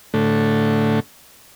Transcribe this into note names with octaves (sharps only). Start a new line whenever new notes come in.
A2 D3 A3